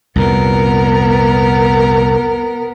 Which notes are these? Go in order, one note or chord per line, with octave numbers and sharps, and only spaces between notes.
C2 F2 A#2 B3 A#4